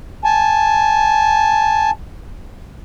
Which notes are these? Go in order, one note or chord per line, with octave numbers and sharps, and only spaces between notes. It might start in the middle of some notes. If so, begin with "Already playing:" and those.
G#5 A5